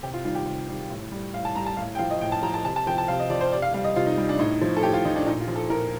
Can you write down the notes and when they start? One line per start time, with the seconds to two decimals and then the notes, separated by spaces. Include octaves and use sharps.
0.03 C3 G4
0.14 F4
0.25 D#3 G3 F4
0.35 G4
0.46 C3
0.68 D#3 G3
0.90 A2
1.12 G3
1.34 A2 F5
1.45 A5
1.55 G3 A#5
1.66 A5
1.77 A2 F5
1.95 G5
1.99 F3 F5
2.11 D#5
2.21 A2 G5
2.32 A5
2.43 F3 A#5
2.54 A5
2.65 C3 A5
2.76 A5
2.87 F3 G5
2.98 A5
3.08 C3 F5
3.19 D#5
3.30 F3 D5
3.41 C5
3.52 C3 D5
3.62 F5
3.74 G3 F5
3.84 D#5
3.96 C3 F4
4.06 D#4
4.18 G3
4.29 D4
4.39 A2 D#4
4.61 F3
4.77 A4
4.83 A2 G4
4.94 F4
5.05 F3 D#4
5.16 D4
5.26 A#2 D#4
5.41 F4
5.48 F3
5.56 A4
5.70 A#2 A#4